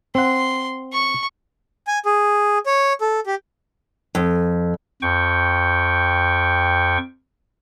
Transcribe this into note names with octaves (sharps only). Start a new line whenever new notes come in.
C4 F#5 C6
C#6
G#5
G#4
C#5
A4
G4
F2
F2 G5 C#6